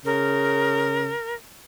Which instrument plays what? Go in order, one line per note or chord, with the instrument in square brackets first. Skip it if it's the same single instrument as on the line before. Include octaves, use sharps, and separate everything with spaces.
[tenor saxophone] C#3 [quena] A#4